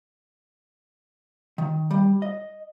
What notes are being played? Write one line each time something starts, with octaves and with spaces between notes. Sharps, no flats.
D#3
G3
D#5